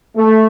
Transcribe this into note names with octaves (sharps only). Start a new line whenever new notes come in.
A3